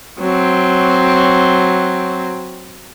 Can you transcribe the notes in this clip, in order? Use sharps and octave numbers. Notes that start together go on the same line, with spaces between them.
F#3 C4